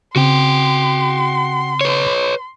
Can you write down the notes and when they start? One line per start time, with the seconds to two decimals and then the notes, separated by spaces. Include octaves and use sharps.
0.16 C#3 C4 F#4 G5 C6
1.81 B4 C#5